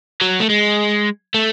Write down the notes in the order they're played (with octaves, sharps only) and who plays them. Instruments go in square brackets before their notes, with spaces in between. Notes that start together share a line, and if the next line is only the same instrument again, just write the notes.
[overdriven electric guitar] F#3
A3
G#3
A3